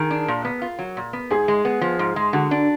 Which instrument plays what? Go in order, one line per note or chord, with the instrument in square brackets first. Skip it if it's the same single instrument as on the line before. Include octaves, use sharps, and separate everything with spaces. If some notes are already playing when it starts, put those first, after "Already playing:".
Already playing: [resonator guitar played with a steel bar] D#3 [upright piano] G#4 A#4
[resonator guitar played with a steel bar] D4
A#2
B3
F4
F#3
A#2
B3
[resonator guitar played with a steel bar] G#2 [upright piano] G#4
[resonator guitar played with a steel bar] G#3
B3
F3
G#2
G#3
[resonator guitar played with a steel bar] D3 [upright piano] F#4
[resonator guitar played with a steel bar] D4